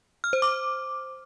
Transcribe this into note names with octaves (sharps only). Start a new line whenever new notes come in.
F6
C5
D6